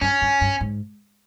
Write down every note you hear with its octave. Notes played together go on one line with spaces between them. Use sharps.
G2 C#4
G2
G2
G#2